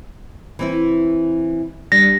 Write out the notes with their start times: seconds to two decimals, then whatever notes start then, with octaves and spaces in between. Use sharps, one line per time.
0.59 E3 C4 E4
1.92 G3 D4 A#6